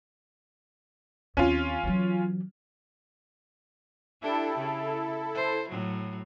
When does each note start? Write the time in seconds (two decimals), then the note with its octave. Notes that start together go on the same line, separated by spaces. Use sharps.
1.37 D#2 C4 C#4 F4
1.84 E3 F#3
4.22 D4 E4 G4 A4
4.58 C#3
5.35 C5
5.69 A2 F#3